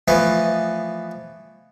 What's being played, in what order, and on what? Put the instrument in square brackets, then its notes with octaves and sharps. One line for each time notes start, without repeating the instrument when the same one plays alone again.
[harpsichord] E3 F3 A3 B3 D#5